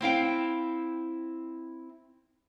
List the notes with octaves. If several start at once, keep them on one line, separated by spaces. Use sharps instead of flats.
C4 E4 F5 G5